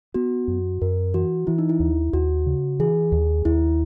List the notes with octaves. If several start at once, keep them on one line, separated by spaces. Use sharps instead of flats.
B3 F#4
F#2
F#2 A#4
E3 F#4
E3 E4
D#4
E4
D#2
D#2 F#4
C#3
E3 G#4
D#2
D#2 E4